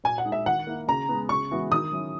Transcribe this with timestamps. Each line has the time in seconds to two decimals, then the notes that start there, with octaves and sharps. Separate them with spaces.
0.04 A#2 G#5
0.18 F#5
0.25 G#3 D#4 G#4
0.32 E5
0.46 D#3 F#5
0.67 A#3 E4
0.88 C#3 A#5
1.09 G#3 B3
1.29 C#3 C#6
1.51 E3 G#3 B3 F#4
1.71 D#3 D#6
1.92 F#3 C#4 E4